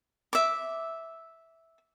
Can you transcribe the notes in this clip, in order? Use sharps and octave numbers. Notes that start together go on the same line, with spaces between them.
E5 D6